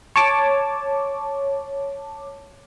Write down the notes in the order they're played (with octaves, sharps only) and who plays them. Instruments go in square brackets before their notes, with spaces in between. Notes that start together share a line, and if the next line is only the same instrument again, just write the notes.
[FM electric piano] C#5 A5 D6